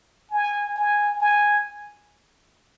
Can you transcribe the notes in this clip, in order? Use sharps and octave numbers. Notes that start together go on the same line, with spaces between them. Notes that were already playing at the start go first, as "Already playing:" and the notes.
G#5
G#5
G#5